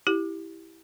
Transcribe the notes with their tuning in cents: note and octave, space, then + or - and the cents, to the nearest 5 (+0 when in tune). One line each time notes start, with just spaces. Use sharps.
E4 -5 G4 +0